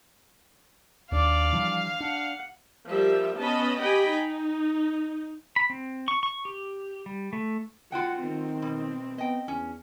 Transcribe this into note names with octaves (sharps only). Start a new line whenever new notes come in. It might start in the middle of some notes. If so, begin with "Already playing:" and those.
D#2 D4 D5 F5
E3 F3 G3
D4 F#5
F3 G3 A#4 E5
B3 C#4 D#5 A5 B5
G4 D#5 G5 G#5 B5
D#4
B5
C4
C#6
C#6
G4
G3
A3
F4 F#4 F#5 G5
D#3 C4
B2
B3 D#5 G5
E2 C#4